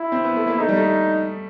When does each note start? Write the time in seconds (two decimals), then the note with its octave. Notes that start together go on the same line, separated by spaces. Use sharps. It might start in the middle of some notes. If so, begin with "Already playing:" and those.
Already playing: E4
0.12 C4
0.24 B3
0.36 A3
0.47 A#3
0.59 A3 D#4
0.69 G3
0.77 A3